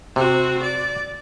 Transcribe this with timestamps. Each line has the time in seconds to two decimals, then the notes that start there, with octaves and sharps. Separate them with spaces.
0.16 C3 C4 F#4
0.62 D5